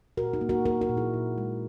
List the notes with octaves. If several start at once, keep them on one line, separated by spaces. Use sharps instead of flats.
A#2 F#4 A#4
D#4 F#4
A#3
F#4 A#4
A#3 F#4 A#4
F#4 A#4
A#2
E4 G#4
A#2
G#3